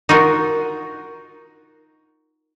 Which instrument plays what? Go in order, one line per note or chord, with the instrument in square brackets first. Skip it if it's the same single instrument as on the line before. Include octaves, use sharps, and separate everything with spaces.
[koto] D#4 F4 F#4 A#4